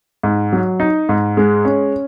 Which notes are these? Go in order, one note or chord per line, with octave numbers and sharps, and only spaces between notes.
G#2
F#3
D#4
G#2
G#3
C#4